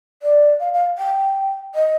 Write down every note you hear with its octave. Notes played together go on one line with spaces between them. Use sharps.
D5
F5
F5
G5
D#5